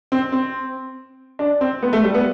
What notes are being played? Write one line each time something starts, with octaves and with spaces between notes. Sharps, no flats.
C4
C4
D4
C4
B3
A3
G3
B3